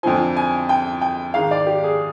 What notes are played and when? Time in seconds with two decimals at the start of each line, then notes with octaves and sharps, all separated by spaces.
0.03 F2 D3 F3 G#5
0.37 G#5
0.69 G5
1.01 G5
1.34 G#2 D#3 F5
1.51 D5
1.66 G4
1.84 G#4